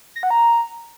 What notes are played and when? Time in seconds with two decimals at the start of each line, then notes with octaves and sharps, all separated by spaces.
0.16 A#6
0.23 F#5
0.30 A#5